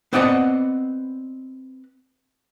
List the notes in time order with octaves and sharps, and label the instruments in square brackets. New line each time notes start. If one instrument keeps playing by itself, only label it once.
[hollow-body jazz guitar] B3 C4 B4 D5 D#5 F#5